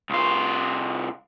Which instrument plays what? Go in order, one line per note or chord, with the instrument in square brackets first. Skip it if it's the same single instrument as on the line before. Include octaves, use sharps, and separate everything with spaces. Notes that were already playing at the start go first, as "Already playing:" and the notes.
[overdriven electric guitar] C2 F4